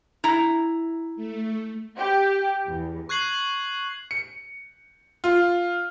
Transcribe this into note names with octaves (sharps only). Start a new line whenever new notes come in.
E4 A#5
A3
G4
E2
C#6 F#6 G#6 C7 F#7
C#7
F4